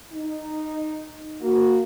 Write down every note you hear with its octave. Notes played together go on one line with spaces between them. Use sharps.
D#4
A#3 F#4